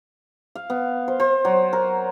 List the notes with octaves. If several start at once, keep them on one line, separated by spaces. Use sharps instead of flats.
F5
B3
C5
C5
F#3
A#4